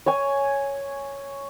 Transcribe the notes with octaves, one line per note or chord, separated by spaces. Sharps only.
C#5 G#5